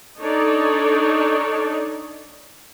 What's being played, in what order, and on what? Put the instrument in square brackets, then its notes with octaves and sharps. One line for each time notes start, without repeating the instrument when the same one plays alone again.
[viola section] D4 D#4 A4 C#5 D5